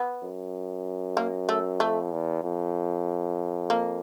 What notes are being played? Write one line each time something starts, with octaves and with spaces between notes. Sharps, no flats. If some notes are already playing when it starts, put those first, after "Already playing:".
Already playing: B3
F#2
A#3
A3
F2 A3
E2
F2
A#3